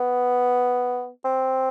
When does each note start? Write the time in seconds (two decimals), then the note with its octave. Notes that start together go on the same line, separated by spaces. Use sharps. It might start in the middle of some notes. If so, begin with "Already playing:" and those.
Already playing: B3
1.25 C4